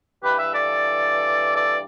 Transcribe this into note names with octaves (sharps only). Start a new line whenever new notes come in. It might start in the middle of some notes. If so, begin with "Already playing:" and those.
G2 E3 G4 B4
B4 E5
A4 D5
A4 D5